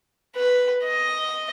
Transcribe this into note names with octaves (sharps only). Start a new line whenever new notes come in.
B4
D#5